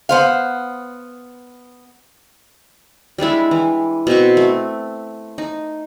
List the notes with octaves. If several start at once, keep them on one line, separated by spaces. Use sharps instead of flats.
B3 C5 F5
G3 G#3 D4 E4
E3
B2 C4 B4 C#6
A3
D#4